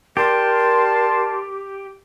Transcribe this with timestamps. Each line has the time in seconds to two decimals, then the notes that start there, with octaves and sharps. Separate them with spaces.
0.17 G4 A#4 D5 A5 C6